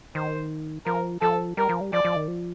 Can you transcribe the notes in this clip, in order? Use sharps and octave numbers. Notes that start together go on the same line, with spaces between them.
D#3 C5
F3 A#4
F3 A4
G3 A#4
F3
G3
F3 D5
F3
D#3
F3